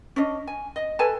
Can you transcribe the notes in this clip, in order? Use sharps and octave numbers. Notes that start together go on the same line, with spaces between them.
C#4 D4 D#5
G#5
D#5
A4 B4 G#5 A5